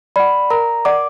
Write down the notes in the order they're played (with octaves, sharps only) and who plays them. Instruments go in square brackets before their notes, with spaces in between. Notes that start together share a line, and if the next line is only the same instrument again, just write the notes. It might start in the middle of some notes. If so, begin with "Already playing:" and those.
[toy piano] D5 F#5 [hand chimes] B5
[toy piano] A#4 [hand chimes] A#5
[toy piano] D5 F#5 [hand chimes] D6